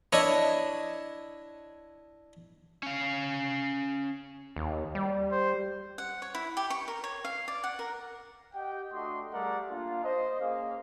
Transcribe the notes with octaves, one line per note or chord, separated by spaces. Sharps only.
D4 E4 C#5 D#5
C#4 F5
D#2
G3
C5
F#5
C#5
E4
G4
C#6
A#4
C#5
F5
D5
F#5
A#4
G4 D#5 F#5 G5
A3 D4 F#4 D#5 C6 D6
G3 A3 G#4 A#4 D5 F#5
A#3 D4 F4
C5 D#5
A#3 C#4 G#4 D#5 F5